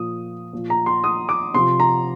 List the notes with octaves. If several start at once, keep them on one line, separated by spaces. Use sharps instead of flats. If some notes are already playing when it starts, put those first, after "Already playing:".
Already playing: A#2 F3 D#6
A#2 F3
A#5
C6
D#6
D6
C3 F3 C6
A#5